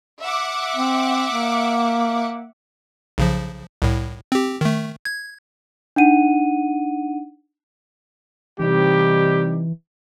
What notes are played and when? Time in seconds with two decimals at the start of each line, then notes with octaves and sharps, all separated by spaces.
0.22 E5 F#5 D6
0.76 C4
1.31 A#3
3.18 B1 C#3 F3
3.82 C2 A2
4.32 C4 G4
4.61 D#3 A3
5.05 G#6
5.96 D4 D#4 F#5 D#7
8.60 C3 E3 G3 D#4 G4